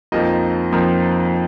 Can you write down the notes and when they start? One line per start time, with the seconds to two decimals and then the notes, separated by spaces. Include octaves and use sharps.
0.12 F2 F3 A#3 D#4 D#5
0.72 F2 F3 A#3 D#4